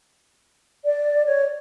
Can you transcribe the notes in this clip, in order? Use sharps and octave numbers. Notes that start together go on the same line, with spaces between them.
D5
C#5